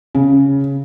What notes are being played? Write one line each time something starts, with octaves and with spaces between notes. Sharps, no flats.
C#3